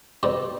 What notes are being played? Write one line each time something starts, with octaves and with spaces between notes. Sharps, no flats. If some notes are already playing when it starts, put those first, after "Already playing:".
B2 G3 C4 G4